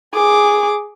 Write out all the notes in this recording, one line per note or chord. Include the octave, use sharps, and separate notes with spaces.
G#4 D6